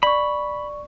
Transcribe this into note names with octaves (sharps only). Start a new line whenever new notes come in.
D5 B5 C#6